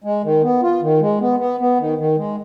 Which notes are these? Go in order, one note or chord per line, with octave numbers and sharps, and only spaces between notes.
G#3
D#3
B3
F4
D#3
G#3
B3
B3
B3
D#3
D#3
G#3